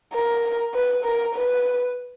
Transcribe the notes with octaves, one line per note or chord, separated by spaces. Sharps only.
A#4
B4
A#4
B4